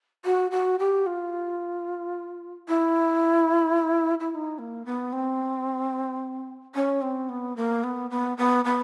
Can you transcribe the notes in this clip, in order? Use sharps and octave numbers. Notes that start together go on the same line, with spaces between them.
F#4
F#4
G4
F4
E4
E4
E4
D#4
A#3
B3
C4
C#4
C4
B3
A#3
B3
B3
B3
B3